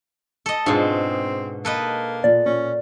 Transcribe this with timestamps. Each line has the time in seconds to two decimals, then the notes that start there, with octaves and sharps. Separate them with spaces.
0.46 A4 D#5
0.66 G#2 B2 C4 D4 F4 G#4
1.65 A#3 A4 B4 D#5
2.24 A#2 D5
2.46 A#2 C#4